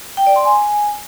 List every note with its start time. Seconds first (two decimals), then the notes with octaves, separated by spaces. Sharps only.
0.17 G5
0.27 D5
0.36 C6
0.45 G#5